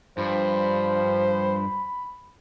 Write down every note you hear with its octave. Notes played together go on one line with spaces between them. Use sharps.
G2 F3 C5 B5